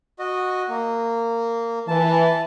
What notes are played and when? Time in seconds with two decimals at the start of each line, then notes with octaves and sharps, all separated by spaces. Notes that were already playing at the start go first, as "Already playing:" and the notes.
0.19 F#4 D#5
0.69 A#3
1.88 E3 A5